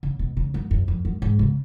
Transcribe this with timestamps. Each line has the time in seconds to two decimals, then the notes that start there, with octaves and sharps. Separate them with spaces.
0.03 C#3
0.19 B2
0.37 C#3
0.54 F#2
0.71 F#2
0.88 F2
1.05 F#2
1.22 G#2
1.39 C#3